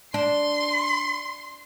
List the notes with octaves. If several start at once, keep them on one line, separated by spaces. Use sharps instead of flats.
D4 C6